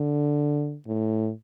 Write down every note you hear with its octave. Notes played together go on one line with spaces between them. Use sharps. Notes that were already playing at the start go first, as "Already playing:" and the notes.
Already playing: D3
A2